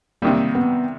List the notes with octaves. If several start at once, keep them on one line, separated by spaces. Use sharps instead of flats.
C3 D#3 G3 A#3
B3